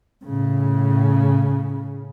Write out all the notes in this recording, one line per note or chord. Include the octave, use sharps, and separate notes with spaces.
A2 C#3